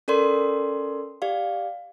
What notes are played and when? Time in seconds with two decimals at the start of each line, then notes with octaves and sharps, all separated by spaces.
0.08 C#4 A4 A#4 D5 C6
1.22 G4 D5 F5